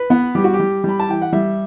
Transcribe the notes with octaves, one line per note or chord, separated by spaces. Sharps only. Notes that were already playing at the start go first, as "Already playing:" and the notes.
Already playing: B4
B3
G3 G4
F#4
G4
G3
G3 B5
A5
E3 G5
F#5
G3 E5